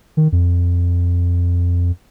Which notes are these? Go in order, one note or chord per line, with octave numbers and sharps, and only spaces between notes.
D#3
F2